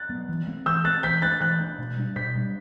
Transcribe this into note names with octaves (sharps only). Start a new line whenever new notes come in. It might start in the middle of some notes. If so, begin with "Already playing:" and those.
Already playing: F#6 A6
F#3 B3
E3
A3 C4
E3 E6 G6
A3 C4 F#6 A6
E3 G6 B6
A3 D4 F#6 A6
E3 F#6 A6
A3 D4
B2
G3 D4
B2 G6 B6
G3 D4